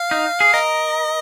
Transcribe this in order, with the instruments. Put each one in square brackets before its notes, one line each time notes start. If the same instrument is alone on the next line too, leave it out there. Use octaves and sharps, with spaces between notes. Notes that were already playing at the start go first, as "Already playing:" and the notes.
Already playing: [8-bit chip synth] F5
[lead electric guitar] D#4
G#4
[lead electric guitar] A#4 [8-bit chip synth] D#5